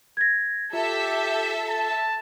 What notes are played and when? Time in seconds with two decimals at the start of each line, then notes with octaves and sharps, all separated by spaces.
0.17 G#6 A#6
0.73 F4 G4 A4 E5
1.69 A5